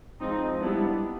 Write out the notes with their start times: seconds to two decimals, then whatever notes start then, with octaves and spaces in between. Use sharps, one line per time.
0.20 F3 G#3 C4 D#4
0.60 G3 B3 D4 E4